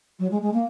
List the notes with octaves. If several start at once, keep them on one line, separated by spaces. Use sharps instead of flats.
F#3
G#3
G#3
A#3